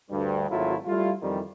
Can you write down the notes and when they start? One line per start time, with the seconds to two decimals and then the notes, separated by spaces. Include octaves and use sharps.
0.11 D2 G2 G3
0.50 G#1 F#3 A3 E4 F4
0.86 G3 A3 E4 F4
1.22 F2 D#3 E3 G3